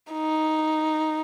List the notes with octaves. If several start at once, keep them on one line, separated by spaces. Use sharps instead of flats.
D#4